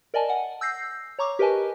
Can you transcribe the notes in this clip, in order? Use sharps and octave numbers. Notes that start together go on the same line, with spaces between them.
A#4 D5 D#5 G#5 A5
F#5 G#5
E6 G6 A#6 C7
C#5 A#5 C#6 D6
G4 A#4 B4 D#5 G#5 A5